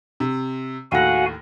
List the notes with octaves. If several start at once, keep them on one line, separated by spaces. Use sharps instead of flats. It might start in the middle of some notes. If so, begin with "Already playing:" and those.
C3
D#2 A2 F#4 F5 F#5 G#5 A#6